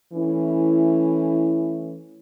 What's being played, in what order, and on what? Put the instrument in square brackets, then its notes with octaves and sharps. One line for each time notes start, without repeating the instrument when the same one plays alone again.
[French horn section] E3 A3 C#4 E4